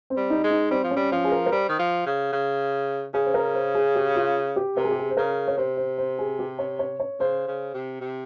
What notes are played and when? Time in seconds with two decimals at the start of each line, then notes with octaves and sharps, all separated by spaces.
0.10 C4
0.17 G3
0.30 D#4
0.44 G#3
0.51 D#4
0.71 G3 C4
0.83 F3
0.91 C#4
0.96 G3
1.12 F3 C#4
1.25 G#4
1.32 A#4
1.46 A#4
1.52 G3 C5
1.69 D#3
1.79 F3
2.06 C#3
2.33 C#3
3.14 C#3 G#4
3.26 C5
3.34 A#4
3.54 C5
3.75 G#4
3.95 G4
4.16 F4
4.56 G4
4.76 C3 A#4
4.84 G#4
4.91 G4
4.99 G#4
5.10 C5
5.17 C#3 A#4
5.48 C#5
5.57 C3 C5
5.77 C5
5.98 C5
6.19 G#4
6.39 G4
6.59 C#5
6.79 C#5
7.00 C#5
7.19 C#3 C5
7.47 C#3
7.74 C3
8.01 C3